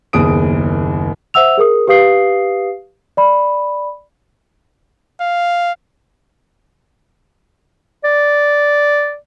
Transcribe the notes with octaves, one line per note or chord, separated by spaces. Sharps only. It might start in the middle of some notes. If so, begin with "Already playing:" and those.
F#1 D#2 B3 G#4 D#6 D7
C5 E5 F#5 E6 F7
G#4 A#4 D#6
G4 B4 F5 D#6 C7
D5 B5
F5
D5